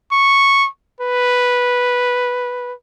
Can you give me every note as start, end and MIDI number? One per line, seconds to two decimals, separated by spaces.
0.12 0.68 85
1.00 2.73 71